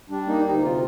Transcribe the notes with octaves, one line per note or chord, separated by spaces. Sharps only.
G3 D4
A#3 D#4
D2 D#4
C3 F4